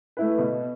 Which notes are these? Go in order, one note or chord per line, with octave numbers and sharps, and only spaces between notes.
A3 E4 B4
B2